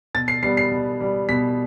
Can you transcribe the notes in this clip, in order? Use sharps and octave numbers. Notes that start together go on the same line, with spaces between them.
B2 A6
C7
G3 B3 C7
C7
B2
G3 B3
B2 B6